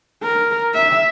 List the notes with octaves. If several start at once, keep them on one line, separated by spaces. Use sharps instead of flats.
A#4
E5